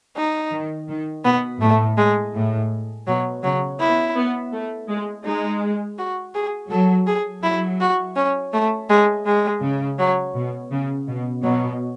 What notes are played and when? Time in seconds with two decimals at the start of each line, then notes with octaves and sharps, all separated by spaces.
0.16 D#4
0.52 D#3
0.89 D#3
1.25 B2 B3
1.61 A2 A3
1.98 G#3
2.35 A2
3.07 B2 F#3
3.43 C#3 F#3
3.80 B3 E4
4.17 B3
4.53 A3
4.89 G#3
5.25 G#3 D#4
5.98 F#4
6.35 G#4
6.71 F#3 A4
7.07 G#4
7.43 F#3 E4
7.81 F#4
8.16 C#4
8.53 A3
8.90 G#3
9.26 G#3
9.62 C#3
9.99 F#3
10.35 B2
10.71 C#3
11.08 B2
11.44 B2 F#3